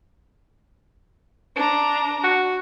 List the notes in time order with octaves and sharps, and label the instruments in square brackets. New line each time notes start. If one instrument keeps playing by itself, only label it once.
[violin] D4 A#5
[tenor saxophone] F#4